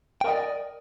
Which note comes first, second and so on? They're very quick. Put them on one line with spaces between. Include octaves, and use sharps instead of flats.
G5 A#4 D#5 D5